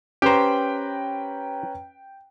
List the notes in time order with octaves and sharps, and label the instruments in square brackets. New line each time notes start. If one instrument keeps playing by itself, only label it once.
[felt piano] C#4 B4 A#5 [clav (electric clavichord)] G4 C5 [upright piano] G5